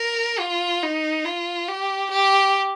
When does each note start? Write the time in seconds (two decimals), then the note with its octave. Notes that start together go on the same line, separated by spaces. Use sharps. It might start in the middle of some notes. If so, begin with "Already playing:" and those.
Already playing: A#4
0.40 F4
0.83 D#4
1.26 F4
1.69 G4
2.12 G4